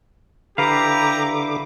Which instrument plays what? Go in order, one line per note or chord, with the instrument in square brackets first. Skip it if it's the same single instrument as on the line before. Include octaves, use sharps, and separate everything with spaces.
[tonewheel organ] D3 D6 [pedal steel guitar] E4 B4 F5 [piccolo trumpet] G4 [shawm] A#5